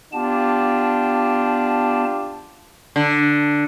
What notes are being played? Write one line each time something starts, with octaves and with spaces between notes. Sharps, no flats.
B3 D4 F4 G4 A5
D3